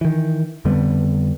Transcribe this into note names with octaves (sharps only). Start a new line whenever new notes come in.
D#3 E3
F2 D3 G3 B3